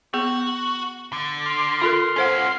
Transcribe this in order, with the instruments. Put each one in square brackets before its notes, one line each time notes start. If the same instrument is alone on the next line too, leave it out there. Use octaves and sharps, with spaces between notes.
[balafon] B3 G#4 [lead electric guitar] F#4
[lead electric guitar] D3
[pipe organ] C6 F6
[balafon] F4 A4 A#4
[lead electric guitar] C#4 F4 [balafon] A4 C5 F#5